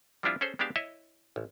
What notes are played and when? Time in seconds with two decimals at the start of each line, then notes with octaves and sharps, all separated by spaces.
0.23 F3 G3 C4 D4 E4 F4
0.41 C#4 G#4 A4 C5
0.59 G#3 B3 D4 G4 F5 A5
0.76 E4 C#5 D#5 E5
1.36 A1